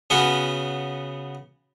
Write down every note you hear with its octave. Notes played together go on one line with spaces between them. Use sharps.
C#3 B3 C#4 F#4